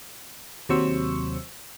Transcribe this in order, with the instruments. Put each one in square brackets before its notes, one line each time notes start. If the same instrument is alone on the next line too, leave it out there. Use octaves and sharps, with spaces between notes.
[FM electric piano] D#2 C3 F#3 C5 C#6 E6